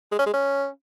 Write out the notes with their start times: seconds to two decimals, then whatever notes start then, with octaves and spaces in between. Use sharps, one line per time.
0.12 G#3
0.19 C#4
0.26 G#3
0.34 C#4